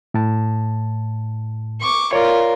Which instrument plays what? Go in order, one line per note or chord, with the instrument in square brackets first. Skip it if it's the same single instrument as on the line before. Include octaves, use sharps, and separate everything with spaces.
[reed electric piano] A2 A5
[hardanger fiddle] C#6 D6
[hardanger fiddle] F4 A#4 [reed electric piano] C#5 D5